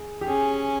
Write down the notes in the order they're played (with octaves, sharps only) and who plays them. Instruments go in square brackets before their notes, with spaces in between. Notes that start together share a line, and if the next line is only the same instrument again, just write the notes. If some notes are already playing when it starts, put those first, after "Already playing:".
Already playing: [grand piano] G#4
G4
[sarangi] C#4 [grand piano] G#4